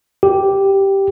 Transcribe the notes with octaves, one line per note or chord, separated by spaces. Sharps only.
G4